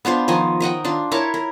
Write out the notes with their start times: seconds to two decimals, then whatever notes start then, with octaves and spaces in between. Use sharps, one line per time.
0.05 B3 D4 F4 C5
0.28 D#3 F3 D#5 G#5
0.60 A#4 D#5 F#5 G5
0.85 D4 F4
1.11 E4 A#4 C#5 A5
1.34 A#4